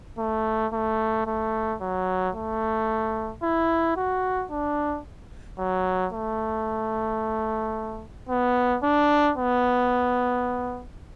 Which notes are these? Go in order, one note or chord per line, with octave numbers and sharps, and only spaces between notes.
A3
A3
A3
F#3
A3
E4
F#4
D4
F#3
A3
B3
D4
B3